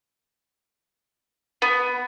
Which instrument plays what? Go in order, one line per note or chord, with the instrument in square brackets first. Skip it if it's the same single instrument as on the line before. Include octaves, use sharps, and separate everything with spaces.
[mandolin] B3